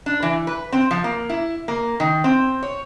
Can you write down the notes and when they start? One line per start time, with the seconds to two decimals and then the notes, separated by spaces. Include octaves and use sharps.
0.06 D4
0.23 E3
0.47 B4
0.72 C4
0.91 F3
1.04 A#3
1.29 E4
1.68 A#3
2.00 D#3
2.24 C4
2.63 C#5